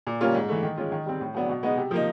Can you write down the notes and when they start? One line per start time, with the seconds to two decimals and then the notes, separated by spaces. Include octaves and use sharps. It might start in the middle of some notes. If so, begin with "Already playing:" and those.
0.07 A#2
0.21 G3 A#3 C#4 F4
0.34 G#2
0.49 E3 A3
0.63 D#3
0.77 G#3 C#4 F4
0.92 D#3
1.06 G3 C4
1.21 A2
1.35 F#3 B3 D4
1.49 B2
1.63 G#3 B3 D#4
1.77 C3
1.91 F3 A#3 D#4